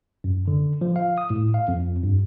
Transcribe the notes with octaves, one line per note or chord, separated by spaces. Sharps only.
F#2
D3
F3
F5
D#6
A2
F5
F2
G2